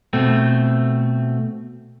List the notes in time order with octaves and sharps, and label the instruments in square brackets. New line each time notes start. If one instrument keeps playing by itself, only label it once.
[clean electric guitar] B2 A3 C4